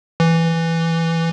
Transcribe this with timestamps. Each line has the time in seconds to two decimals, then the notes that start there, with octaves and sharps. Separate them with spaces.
0.20 E3